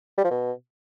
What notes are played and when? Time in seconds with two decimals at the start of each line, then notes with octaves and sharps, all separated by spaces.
0.18 G3
0.24 F3
0.31 B2